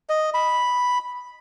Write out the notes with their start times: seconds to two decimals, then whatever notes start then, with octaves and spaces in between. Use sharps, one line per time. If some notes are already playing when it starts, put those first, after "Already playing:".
0.09 D#5
0.34 B5